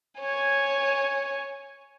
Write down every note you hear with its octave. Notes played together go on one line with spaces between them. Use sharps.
C#5 G#5